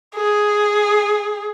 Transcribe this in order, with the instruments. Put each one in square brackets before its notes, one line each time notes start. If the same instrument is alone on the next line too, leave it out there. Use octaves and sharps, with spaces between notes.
[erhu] G#4